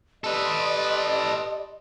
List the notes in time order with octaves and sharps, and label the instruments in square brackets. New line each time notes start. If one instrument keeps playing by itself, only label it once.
[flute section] G4 D5 C6 [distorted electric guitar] A4 B4 [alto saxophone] D#5